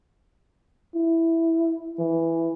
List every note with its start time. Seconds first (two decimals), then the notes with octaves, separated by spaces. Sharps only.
0.94 E4
1.99 E3